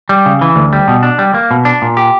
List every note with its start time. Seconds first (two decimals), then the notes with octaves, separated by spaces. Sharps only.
0.09 G3
0.26 C#3
0.41 E3
0.56 D2
0.73 G3
0.88 B2
1.03 D4
1.19 G3
1.34 A#3
1.51 B2
1.65 D4
1.82 A#2
1.97 G4